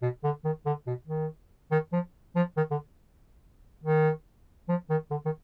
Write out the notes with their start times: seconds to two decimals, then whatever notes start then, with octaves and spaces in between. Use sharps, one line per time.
0.02 B2
0.23 D3
0.44 D#3
0.65 D3
0.87 B2
1.07 D#3
1.71 D#3
1.93 F3
2.36 F3
2.57 D#3
2.71 D3
3.84 D#3
4.69 F3
4.90 D#3
5.11 D3
5.25 D#3